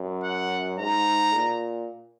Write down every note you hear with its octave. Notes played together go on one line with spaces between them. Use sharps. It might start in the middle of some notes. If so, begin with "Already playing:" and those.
Already playing: F#2
F#5
G#2 A#5
A#2